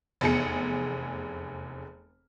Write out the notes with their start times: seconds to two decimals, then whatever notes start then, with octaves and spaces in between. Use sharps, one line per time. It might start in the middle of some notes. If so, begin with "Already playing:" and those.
0.21 F1 E2 G#4 C#7